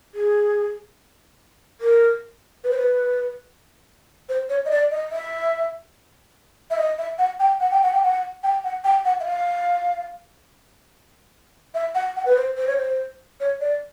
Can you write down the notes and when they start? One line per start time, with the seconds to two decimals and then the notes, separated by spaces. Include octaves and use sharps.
0.15 G#4
1.81 A#4
2.64 B4
2.71 C5
2.78 B4
4.29 C5
4.50 C#5
4.65 D#5
4.71 D5
4.91 D#5
5.12 E5
6.71 E5
6.78 D#5
6.98 E5
7.19 F#5
7.40 G5
7.60 F#5
7.71 G5
7.82 F#5
7.93 G5
8.03 F#5
8.43 G5
8.64 F#5
8.84 G5
9.05 F#5
9.20 E5
9.25 F5
11.75 E5
11.95 F#5
12.16 F#5
12.26 B4
12.37 C5
12.57 C5
12.67 C#5
12.77 C5
13.40 C#5
13.61 D5